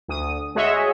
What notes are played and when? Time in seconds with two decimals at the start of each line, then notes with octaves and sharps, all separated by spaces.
0.08 D2 D#6
0.55 G#3 F#4 G#4 C#5 D#5 E5